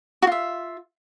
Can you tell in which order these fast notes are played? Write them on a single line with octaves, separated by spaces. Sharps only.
F#4 F4 E5